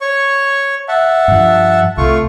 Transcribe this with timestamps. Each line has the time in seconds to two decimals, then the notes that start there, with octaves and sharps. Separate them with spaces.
0.01 C#5 C#6
0.88 E5 F#5 A5
1.28 G2 F3
1.97 C2 A3 F4 C#6